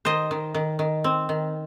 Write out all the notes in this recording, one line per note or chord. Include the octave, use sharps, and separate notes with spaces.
D#3 C5 D#5
D#3
D#3
D#3
C4
D#3